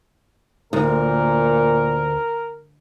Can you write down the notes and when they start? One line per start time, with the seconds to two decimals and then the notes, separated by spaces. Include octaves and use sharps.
0.73 D2 A#2 A#4